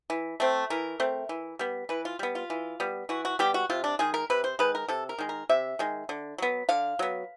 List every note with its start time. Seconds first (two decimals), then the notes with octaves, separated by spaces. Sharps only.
0.10 E3
0.40 A3 C4
0.70 E3 A#4
1.00 A3 C4
1.29 E3
1.59 G3 B3
1.89 E3 B4
2.05 F4
2.19 G3 B3
2.35 F4
2.50 E3
2.80 G3 B3
3.09 E3 F#4
3.25 F#4
3.39 G3 B3 G4
3.54 F#4
3.70 C3 F4
3.84 D4
3.99 D#3 G#3 G#4
4.14 A#4
4.30 C3 B4
4.44 C5
4.59 D#3 G#3 B4
4.75 A#4
4.88 C3 A4
5.09 A#4
5.18 D#3 G#3
5.29 A#4
5.49 C3 E5
5.79 D#3 G#3
6.09 D3
6.38 F#3 B3
6.69 D3 F5
6.99 F#3 B3